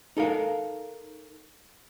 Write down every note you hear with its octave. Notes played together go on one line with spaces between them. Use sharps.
D#4 A4 A#4 F5